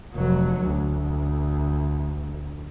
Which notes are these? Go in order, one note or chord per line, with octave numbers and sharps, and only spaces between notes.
F1 F#3
D2